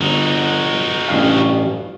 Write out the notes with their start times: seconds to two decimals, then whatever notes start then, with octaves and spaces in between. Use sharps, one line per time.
0.01 G1 D#4 F#4
1.08 A1 G2 F5